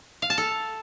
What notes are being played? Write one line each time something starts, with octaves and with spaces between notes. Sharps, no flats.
F5
A5
A4